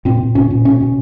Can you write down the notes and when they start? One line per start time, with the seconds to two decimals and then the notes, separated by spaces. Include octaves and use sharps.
0.05 A#2 C4
0.20 A#2
0.35 A#2 C#4
0.51 A#2
0.65 B2 C#4
0.80 B2